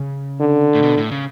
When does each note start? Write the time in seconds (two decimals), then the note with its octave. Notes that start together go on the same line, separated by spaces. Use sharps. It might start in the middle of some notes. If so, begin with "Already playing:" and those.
Already playing: C#3
0.40 D3
0.75 A2
0.83 B2
0.97 A2
1.11 C#3